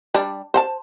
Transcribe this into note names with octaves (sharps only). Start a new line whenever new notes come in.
G3 D4
C5 F#5 A5